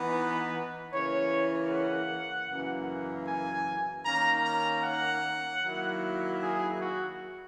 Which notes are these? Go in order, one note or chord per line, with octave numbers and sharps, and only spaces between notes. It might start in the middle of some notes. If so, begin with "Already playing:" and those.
Already playing: E3 B3 D#4
B4
C#3 E3 A#3 C#5
F#5
F#2 C#3 E3 A#3
G#5
D#3 A#3 C#4 A#5
A#5
F#5
D#3 F#3 A#3 E4
G#4
F#4